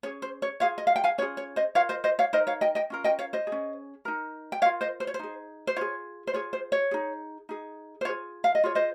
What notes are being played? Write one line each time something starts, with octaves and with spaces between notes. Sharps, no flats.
C#4 G#4 C#5
C5
C#5
F4 G#4 C#5 F5
D#5
F5
G5
F5 G#5
C#4 F4 G#4 C#5
C#5
C5 D#5
F4 A#4 C#5 F5
C5 D#5
C5 D#5
C#5 F5
D#4 A#4 C5 D#5
C#5 F5
D#5 G5
D#5 G5
C#4 F4 A#4
D#5 G5
C#5 F5
C5 D#5
G#4
C#4
D#4 A#4
G5
F4 A#4 C#5 F5
C5 D#5
C5
C#5
C5
D#4 G#4
C5
F4 G#4 C#5
C5
F4 G#4 C#5
C5
C#5
D#4 G#4
D#4 G#4
C5
F4 G#4 C#5
F5
D#5
F4 G#4 C#5
C5 D#5